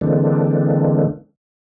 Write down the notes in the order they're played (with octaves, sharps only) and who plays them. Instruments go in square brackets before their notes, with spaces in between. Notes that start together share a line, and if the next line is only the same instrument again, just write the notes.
[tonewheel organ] D3 E3 G#3 A#3 C4 D4